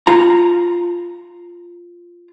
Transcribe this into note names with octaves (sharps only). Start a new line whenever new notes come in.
F4 A#5